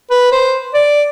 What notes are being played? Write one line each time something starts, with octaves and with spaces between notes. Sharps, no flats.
B4
C5
D5